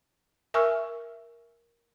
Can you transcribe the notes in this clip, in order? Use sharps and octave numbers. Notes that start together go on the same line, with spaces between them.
A#4 E5 G#5 C#6 E6 F6